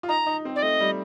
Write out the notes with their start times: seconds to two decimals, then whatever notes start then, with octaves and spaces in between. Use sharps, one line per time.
0.03 F4
0.09 D#4 A#5
0.26 D#4
0.45 C4
0.56 D5
0.63 A3 D#5
0.80 G3